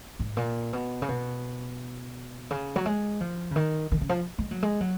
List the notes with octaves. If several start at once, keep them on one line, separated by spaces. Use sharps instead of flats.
G#2
A#2
B2
C#3
B2
C#3
F#3
G#3
F3
C#3
D#3
D#3
C#3
F3
G#3
F#3
G#3
F#3